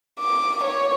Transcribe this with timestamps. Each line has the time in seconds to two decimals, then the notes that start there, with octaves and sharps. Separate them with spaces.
0.20 D6
0.64 C#5